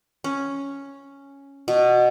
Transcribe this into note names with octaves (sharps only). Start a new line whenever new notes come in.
C#4
B2